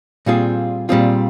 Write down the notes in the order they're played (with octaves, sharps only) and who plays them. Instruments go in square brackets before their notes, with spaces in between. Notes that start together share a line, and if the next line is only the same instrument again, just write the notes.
[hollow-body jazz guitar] A#2 G3 C4 F4 G#4
A#2 G3 C4 F4 G#4